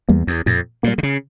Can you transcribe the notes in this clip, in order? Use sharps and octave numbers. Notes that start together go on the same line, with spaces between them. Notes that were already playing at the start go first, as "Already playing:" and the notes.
E2 G3 A#3
E2
F2 A#2
A#2 G3 A#3
D3
C#3